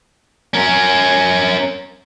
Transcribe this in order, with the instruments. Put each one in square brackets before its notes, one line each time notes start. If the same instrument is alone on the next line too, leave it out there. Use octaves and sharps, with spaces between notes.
[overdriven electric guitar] C#4 A#4